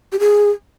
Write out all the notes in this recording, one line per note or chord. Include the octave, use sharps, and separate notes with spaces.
G4
G#4